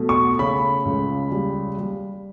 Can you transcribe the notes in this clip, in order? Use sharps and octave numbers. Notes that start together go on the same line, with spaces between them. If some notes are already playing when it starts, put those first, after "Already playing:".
Already playing: B2 A3
C#6
C#3 B5
C#2
G3
G3